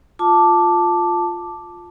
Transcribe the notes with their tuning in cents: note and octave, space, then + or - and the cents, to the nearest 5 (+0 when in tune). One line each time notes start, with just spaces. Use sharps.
F4 +5 A5 +0 D6 +0